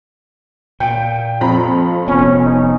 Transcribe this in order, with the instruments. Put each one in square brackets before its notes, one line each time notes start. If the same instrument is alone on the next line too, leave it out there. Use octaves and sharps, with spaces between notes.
[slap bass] A#2 [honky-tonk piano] G5
[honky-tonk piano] F2 A#5 B5 [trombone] F3
[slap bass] F1 B3 [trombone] C#4
[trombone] D#4